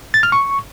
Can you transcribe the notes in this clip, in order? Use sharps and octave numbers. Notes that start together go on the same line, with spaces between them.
A6
F6
C#6